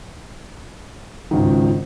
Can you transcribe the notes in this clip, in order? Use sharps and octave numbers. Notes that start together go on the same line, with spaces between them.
G#1 C#2 D#3